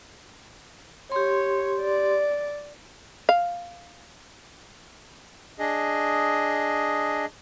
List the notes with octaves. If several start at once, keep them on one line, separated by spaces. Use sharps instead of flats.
G4 C#5 C6
D5
F5
D4 G#4 D#5